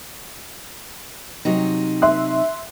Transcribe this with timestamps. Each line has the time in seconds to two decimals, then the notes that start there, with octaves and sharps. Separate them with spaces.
1.45 C3 F#3 D#4
2.02 E5 C6 F#6